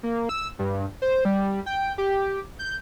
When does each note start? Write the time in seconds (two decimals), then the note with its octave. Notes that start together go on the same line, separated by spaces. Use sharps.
0.03 A#3
0.29 E6
0.59 G2
1.02 C5
1.25 G3
1.66 G5
1.98 G4
2.59 G6